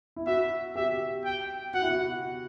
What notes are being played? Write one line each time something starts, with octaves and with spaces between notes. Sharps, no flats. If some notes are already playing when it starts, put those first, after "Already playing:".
E4
F#4 E5
G4 E5
G5
F#4 F#5
E4
F#4